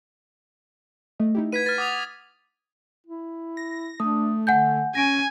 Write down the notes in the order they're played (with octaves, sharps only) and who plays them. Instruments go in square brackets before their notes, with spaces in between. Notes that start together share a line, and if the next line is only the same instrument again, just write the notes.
[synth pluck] A3 D#5
D#4 E4 G4
[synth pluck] B4 F#5 [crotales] G#6 B6 D#7
[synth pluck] B4 [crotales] F6 A6
[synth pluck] F#5 [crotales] D6 D#6 F7
[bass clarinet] E4
[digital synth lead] A#6
[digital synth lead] A3 [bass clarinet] D4 [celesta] D#6
[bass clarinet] D3 [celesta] F#5 G#5 G6
[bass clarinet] C#4 [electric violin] G#5 [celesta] A#6 D7